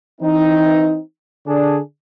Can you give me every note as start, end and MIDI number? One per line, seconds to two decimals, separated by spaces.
0.21 0.99 52
0.21 0.99 60
0.21 0.99 63
1.47 1.79 50
1.47 1.79 62
1.47 1.79 68
1.47 1.79 74